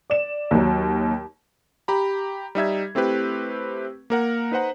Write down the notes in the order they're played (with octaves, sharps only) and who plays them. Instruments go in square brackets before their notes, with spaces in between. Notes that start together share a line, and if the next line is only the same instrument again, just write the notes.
[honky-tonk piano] D5 E7
D#2 F#3
[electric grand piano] G4 A#5 B5
G3 D#4 E5 G#6
A3 C4 E4 G4 B4
A#3 A#4 F#5
D#4 B4 C5 F#5 A#5